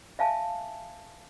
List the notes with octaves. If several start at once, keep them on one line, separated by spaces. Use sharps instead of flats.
E5 F5 G#5 A5